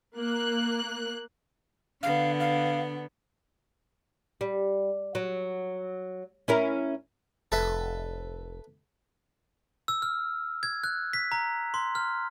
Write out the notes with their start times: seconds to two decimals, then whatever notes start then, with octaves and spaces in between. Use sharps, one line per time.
0.17 A#3 F#6
2.03 D3 B3 F5
2.40 F5
4.41 G3
5.15 F#3
6.48 C#4 E4 A#4
7.52 F1 A4 B4 E5
9.88 E6
10.02 F6
10.63 G#6
10.84 F#6
11.13 B6
11.32 A#5
11.74 C6
11.95 F6